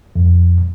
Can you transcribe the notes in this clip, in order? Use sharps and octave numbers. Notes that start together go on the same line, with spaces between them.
F2